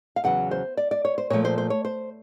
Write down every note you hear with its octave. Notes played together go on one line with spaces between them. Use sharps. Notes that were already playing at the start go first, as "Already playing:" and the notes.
F5
E2 C#3 F#3 F#5
C5
D5
D5
C#5
C5
A#2 F3 A3 C#5
C5
C5
C#5
C5